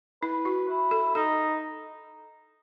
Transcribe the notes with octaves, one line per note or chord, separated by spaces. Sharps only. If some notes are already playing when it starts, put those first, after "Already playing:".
E4 B4
F#4
E4
A4
D#4 A4